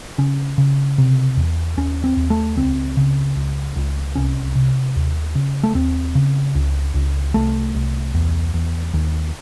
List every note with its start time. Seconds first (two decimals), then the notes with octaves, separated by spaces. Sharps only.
0.18 C#3 C#4
0.58 C#3
0.98 C3
1.37 E2
1.77 D#2 C#4
2.04 C4
2.17 D#2
2.30 A3
2.57 C#2 C4
2.97 C#3
3.36 C#2
3.76 C#2
4.15 C2 C#4
4.55 C3
4.96 D#2
5.35 C#3
5.63 A3
5.75 D#2 C4
6.15 C#3
6.55 C#2
6.94 C#2
7.34 C2 A3
7.75 C2
8.14 E2
8.54 E2
8.94 D#2